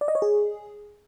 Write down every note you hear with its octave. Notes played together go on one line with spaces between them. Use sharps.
D5
D#5
C#5
G#4